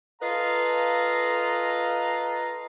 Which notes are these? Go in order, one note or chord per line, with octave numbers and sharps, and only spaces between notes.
F4 A4 B4 D#5 F5 A#5